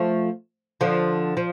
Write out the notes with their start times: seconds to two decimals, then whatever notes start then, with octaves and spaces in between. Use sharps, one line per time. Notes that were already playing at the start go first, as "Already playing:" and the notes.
Already playing: F3 A3
0.81 D3 F3
1.37 F3